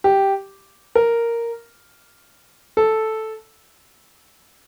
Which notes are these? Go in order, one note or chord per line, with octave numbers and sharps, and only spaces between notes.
G4
A#4
A4